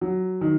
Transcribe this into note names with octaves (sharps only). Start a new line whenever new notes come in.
F#3
D#3